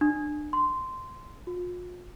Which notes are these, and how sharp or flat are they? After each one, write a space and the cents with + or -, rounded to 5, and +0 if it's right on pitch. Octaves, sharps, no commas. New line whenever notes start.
D4 +30
C6 -10
F4 +40